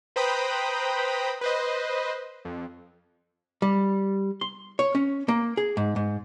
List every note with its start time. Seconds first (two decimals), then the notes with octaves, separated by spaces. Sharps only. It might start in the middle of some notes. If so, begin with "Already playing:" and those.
0.16 B4 C5 G5 A#5 B5 D#6
1.41 B4 C5 D#5
2.45 F2
3.62 G3
4.41 C6
4.79 C#5
4.95 C#4
5.28 A#3
5.57 G#4
5.77 G#2
5.96 G#2